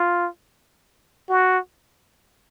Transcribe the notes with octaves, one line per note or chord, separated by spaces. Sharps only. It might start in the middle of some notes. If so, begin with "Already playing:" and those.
Already playing: F4
F#4